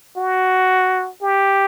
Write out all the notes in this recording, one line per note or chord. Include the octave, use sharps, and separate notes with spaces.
F#4
G4